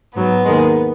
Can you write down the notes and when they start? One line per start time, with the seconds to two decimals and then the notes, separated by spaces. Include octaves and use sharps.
0.16 G#2 F#3 B3
0.45 D#2 D#3 G#3